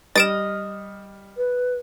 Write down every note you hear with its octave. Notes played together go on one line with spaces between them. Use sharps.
G3 D#5 F6 A6 D7 E7
B4